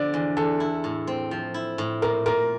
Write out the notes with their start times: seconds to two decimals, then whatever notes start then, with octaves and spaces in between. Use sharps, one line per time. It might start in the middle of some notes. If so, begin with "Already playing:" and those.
Already playing: D3 F3 D5
0.14 E2
0.37 E2 A4
0.60 E4
0.84 A2
1.07 C4
1.31 F3
1.54 E4
1.78 A2
2.02 A#2 A#4
2.26 A#2 A#4